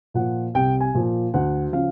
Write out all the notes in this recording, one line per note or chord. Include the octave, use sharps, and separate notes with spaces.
A#2 F3 F#5
C2 G5
G#5
A#2 F3
D2 F#5
C#3 F3 F5